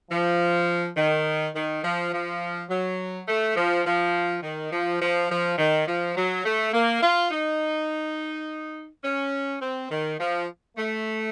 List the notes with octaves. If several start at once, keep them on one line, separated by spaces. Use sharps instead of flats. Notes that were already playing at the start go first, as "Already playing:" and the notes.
F3
D#3
D#3
F3
F3
F#3
A3
F3
F3
D#3
F3
F3
F3
D#3
F3
F#3
A3
A#3
F4
D#4
C#4
C4
D#3
F3
A3